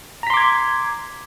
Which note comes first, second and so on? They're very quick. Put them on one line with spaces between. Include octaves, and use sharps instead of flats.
A#5 B6 C6 D6 G#6